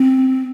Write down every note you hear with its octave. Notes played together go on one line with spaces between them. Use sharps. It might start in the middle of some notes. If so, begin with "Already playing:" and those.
Already playing: C4